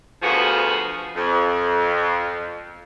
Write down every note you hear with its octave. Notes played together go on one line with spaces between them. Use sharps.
D2 F3 B3 F4 F#4 G#4
F2